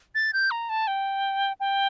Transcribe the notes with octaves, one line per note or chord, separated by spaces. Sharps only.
A6
G6
A#5
A5
G5
G5